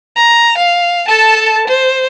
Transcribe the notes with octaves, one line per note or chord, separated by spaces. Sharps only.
A#5
F5
A4 A5
C5